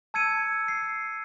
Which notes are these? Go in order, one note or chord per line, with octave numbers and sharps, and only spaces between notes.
A5 E6 G#6 C#7 D#7
C7